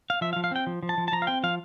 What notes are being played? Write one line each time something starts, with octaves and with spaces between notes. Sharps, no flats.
F5
F3 E5
F5
F3
F5
C4 G5
F3
F3
A5
F3
A5
F3 A#5
F5
C4 G5
F3 F5